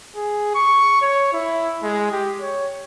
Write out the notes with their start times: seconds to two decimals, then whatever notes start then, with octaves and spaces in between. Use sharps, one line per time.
0.15 G#4
0.54 C#6
1.02 C#5
1.33 E4
1.82 G#3
2.12 G4
2.41 C#5